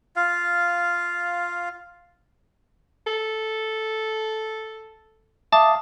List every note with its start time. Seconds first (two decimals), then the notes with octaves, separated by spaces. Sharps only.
0.16 F4 F5
3.07 A4
5.52 E5 F5 A5 D6 D#6